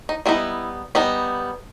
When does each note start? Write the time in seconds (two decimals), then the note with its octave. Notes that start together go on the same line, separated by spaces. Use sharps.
0.09 D#4
0.26 G3 B3 D#4 E4
0.95 G3 B3 D#4